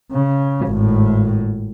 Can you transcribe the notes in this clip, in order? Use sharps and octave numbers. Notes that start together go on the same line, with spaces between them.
C#3
G#1 A2